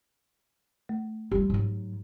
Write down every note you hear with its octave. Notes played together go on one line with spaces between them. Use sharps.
A3
G3 F4 G4
G#2 F#3